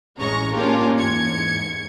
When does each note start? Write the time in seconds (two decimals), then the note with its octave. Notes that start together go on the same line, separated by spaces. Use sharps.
0.18 A1 G#3 C#4 A#5 C#6 A#6
0.55 A#3 C#4 D4 F4 G4 A#4
0.98 E2 G#2 G#6 C#7